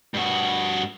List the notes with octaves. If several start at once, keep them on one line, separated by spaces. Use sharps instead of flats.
G2 F#4